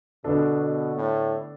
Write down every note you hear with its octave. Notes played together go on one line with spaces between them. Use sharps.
B2 D3 B3 D4 A4
B2
A2